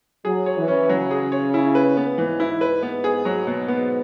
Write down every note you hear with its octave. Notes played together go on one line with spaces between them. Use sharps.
F#3 G#4
C#5
E3
C#4
C#3 F#3
G#4
C#5
E4
B4
B3
G#2 E3
E4
B4
B3
G#4
F#3
B2
B3